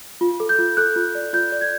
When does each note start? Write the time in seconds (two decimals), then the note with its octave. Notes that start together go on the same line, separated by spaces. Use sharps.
0.21 F4
0.40 A4
0.49 G6
0.59 F4
0.77 A4 F#6
0.96 F4
1.15 D5
1.33 F4 G6
1.52 D5
1.61 G#6